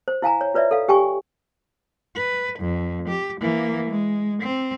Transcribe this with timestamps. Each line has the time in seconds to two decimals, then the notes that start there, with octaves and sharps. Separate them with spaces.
0.08 C5
0.22 E4 F5 G#5 A#5
0.41 C#5
0.54 F4 B4 C#5 D5 E5
0.71 A4 F5
0.88 G4 G5 G#5 C#6
2.15 B4
2.59 F2
3.09 G4
3.41 E3 A#3
3.90 G#3
4.43 C4